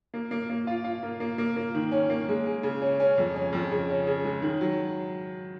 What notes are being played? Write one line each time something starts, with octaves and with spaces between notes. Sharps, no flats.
A#3
A#3
A#3
F4
F4
A#3
A#3
A#3
A#3
D#3
C#4
A#3
G#3
G#3
C#3
C#4
C#4
F2
C#4
F2
C#3
C#4
C#3
G#3
D#3
F#3